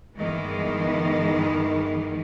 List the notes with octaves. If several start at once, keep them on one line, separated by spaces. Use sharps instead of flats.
G2 D#3 E3 G#3 B3